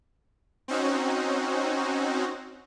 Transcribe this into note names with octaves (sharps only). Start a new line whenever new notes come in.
C4 C#4 D#4 F#4